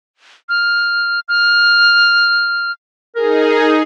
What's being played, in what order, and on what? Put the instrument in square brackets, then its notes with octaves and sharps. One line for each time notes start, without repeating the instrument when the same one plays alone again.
[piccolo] F6
F6
[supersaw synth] D#4 G#4 [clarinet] A#4